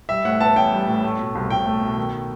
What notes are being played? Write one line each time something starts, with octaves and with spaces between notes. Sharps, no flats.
G3 E5
A2 F#5
B3 A5
A1 G5
G3
A2
A3
B2
C2
C2 G5
A3
B2
D#3